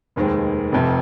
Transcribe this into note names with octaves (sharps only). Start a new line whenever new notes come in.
F1 D#2 D#3 G#3 C4
F1 F2 C3